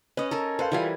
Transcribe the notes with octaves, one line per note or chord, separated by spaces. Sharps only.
C#4 B4 D#5
A4 A#4 G#5 A#5
A4 B4 C5 F5
E3 G3 F4 A4 F5 G#5